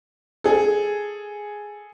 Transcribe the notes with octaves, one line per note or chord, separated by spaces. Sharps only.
G#4 A4